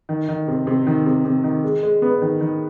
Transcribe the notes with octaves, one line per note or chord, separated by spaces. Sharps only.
D#3
D#3
C3
C3
D#3
C3
C3
D#3
G#3
G#3
B3
D#3
D#3